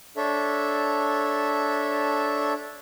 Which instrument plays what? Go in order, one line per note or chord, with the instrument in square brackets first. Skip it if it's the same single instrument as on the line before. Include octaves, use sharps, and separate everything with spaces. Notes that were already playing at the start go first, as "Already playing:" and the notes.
[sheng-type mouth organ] D4 A4 C#5 E5